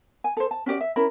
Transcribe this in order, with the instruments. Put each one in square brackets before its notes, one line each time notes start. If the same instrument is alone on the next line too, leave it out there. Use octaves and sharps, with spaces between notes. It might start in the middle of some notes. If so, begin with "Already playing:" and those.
[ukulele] G#5
A4 C5
A5
C#4 F#4 G4 D5
E5
C#4 E4 A#4 B5